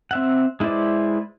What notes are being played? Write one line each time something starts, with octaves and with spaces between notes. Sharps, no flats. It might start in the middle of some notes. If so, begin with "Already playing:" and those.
C4 E5 F#5
G#3 E4 B4 C5 D5